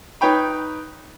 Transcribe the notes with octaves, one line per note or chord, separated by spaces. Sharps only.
D#4 B4 C#5 G5 B5